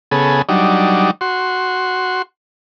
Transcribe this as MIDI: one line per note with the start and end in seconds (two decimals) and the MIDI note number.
0.11 0.42 49
0.11 0.42 59
0.11 0.42 68
0.11 0.42 69
0.49 1.11 54
0.49 1.11 55
0.49 1.11 62
0.49 1.11 63
1.21 2.22 66
1.21 2.22 84